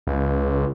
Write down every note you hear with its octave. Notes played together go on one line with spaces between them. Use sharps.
C#2